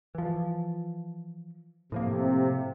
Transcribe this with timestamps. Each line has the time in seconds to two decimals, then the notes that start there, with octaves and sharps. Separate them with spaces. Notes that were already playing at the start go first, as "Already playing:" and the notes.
0.15 E3 F3
1.92 A2 C3 F3 A#3